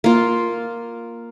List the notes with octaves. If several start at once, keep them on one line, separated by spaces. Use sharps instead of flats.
A#3 F4